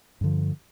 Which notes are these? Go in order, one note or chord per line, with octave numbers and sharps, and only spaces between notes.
G2 D3 F3